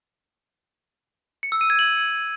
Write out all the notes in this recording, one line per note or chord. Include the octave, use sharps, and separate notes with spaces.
C#7
E6
D#7
G#6
F#7